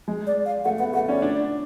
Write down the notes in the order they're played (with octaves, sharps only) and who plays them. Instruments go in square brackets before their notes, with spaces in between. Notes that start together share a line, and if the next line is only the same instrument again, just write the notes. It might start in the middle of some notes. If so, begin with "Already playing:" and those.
[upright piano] G#3
[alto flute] D5
F5
[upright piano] A3 [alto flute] F#5
[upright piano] B3 [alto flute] F#5
[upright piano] A3 [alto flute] F#5
[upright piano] C#4 [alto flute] D5
[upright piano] D4